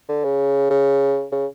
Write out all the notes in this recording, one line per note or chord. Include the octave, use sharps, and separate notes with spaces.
D3
C#3
C#3
C#3